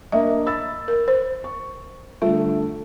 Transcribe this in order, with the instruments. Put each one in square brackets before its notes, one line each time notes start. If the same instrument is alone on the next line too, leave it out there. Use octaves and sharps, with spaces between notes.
[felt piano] A#3 D4 D#5 [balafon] E5
[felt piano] B5 E6 A6
[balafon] A#4
C5
[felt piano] C#6
[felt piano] D3 A3 [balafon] G3 F4